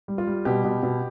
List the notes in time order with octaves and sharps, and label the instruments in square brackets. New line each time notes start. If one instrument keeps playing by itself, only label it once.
[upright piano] G3
F4
G3
B2 G4
B2
B2